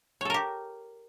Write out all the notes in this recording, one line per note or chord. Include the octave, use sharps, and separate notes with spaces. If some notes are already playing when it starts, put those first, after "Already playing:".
G4 A4 A#4 C#5